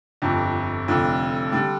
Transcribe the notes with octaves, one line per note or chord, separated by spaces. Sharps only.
G1 F2 D3
F1 F2 D3
D3 G3